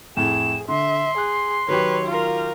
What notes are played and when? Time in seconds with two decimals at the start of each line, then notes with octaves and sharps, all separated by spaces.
0.17 F2 A2 G#4 E7
0.68 D3 E5 C6
1.18 G#4 F#6
1.68 D#3 F#3 G4 B4 C#5
2.06 F4 A#4